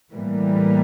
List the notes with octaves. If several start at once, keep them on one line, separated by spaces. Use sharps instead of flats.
A2 E3 G3 A#3